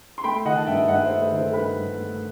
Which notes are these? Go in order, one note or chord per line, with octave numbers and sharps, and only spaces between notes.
C6
A3 G5 B5
D#3 D#5 F#5
A5
G2 E5 G5
G2 D#5 F#5
C5 E5
A3
B4 D#5
D#3
A4 C5
G2 B4 D#5
G2
A3